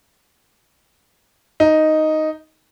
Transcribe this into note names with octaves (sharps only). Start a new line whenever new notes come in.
D#4